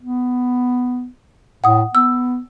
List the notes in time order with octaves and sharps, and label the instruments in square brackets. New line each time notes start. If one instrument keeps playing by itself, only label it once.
[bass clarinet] B3
[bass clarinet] A2 [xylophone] F#5 D#6
[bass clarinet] B3 [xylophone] E6